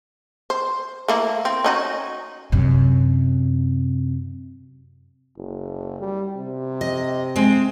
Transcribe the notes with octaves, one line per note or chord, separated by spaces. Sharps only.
C5
A3 A#3 E4
C4
C#4 D#4 F#4
F#2 C3
F#1
G3
C3
D#5
G#3 C4